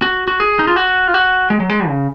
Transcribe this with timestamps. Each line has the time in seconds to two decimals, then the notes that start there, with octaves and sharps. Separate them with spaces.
0.02 F#4
0.28 F#4
0.40 G#4
0.59 D#4
0.67 F4
0.76 F#4
1.08 F4
1.14 F#4
1.50 G#3
1.60 F#3
1.69 G#3
1.87 C#3